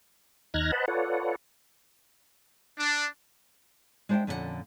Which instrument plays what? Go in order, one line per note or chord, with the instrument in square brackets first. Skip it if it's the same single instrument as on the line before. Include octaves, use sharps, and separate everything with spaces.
[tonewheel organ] D#2 D#4 F6 F#6 G#6 A#6
B4 C5 D#5 F#5 A5 B5
F4 A4 B4 C#5 D5 F#5
[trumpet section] D4
[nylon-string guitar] G#3 D4 C5 C#5 E5 G5
F2 A#2 D3 C#4 A4 F#5